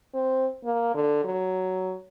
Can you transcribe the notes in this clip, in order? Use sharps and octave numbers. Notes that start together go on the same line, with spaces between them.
C4
A#3
D3
F#3